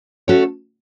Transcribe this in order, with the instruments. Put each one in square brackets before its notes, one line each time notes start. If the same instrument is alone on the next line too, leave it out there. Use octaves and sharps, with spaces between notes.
[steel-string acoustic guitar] A3 C#4 F#4 A4 C#5